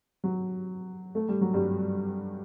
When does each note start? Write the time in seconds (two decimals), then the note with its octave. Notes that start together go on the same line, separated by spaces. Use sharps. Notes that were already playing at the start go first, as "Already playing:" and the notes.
0.24 F#3
1.15 A3
1.29 G3
1.41 F#3
1.54 G2 G3